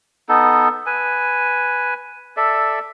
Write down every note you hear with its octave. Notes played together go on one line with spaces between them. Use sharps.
B3 D#4 A4
B4 G#5
A4 D5 E5